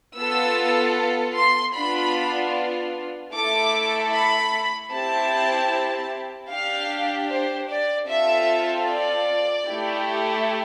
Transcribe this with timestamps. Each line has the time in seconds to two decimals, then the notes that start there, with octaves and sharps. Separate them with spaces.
0.17 B3 F4 A4 E6
1.36 C6
1.75 B3 D4 F4 B5
3.33 A3 E4 A4 D6
4.13 B5
4.91 C4 E4 G4 A5
6.50 D4 G4 F5
7.30 C5
7.70 D5
8.08 C4 F4 A4 E5
8.88 D5
9.68 A3 E4 G4